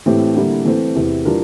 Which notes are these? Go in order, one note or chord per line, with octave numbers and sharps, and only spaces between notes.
A2 E3 A3 C4 G4
D3 G3 A#3 E4
E3 A3 C4
E2 C3 E3
E3 G3 D4 F4 A#4